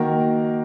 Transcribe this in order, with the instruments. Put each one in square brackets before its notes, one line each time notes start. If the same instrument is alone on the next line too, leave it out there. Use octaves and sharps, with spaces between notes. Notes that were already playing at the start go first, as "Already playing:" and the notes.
Already playing: [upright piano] D#3 A#3 F#4 A#4